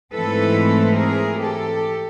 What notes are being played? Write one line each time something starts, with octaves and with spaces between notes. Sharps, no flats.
G#2 E3 A3 C4 A4 B4
G#4 A#4
G4 A4